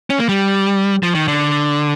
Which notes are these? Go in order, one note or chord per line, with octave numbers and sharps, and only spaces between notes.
C#4
A#3
G3
F3
D#3
D3